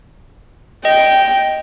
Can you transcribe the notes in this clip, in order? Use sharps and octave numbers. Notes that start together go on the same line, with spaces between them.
D#5 G5